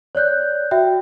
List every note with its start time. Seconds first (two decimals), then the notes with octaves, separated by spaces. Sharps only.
0.15 C#5 D5 F#6 G6
0.71 F#4 E5 G5